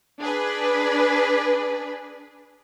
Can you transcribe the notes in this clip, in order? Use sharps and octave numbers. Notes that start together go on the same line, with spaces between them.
D4 G#4 B4